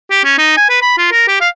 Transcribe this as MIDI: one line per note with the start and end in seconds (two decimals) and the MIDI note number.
0.11 0.24 67
0.24 0.34 61
0.38 0.57 63
0.57 0.69 80
0.69 0.79 71
0.82 0.96 83
0.98 1.07 65
1.11 1.24 70
1.28 1.38 67
1.41 1.48 77